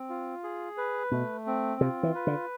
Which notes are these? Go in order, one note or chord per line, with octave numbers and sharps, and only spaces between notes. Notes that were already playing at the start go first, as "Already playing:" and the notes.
Already playing: C4
F4
G#4
B4
B2 A3
C4
C3 F4
E3
B4
D3